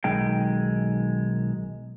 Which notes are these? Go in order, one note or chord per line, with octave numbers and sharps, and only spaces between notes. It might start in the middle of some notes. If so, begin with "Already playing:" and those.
B1 D#3 G#3 G5